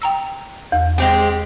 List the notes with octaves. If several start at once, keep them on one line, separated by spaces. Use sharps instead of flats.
G5 A#5 E6
E2
G#3 C4 G4